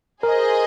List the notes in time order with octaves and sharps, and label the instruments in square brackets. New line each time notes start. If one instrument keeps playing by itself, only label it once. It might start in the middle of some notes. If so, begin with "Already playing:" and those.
[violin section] G#4 C5 D#5 [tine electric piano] A#4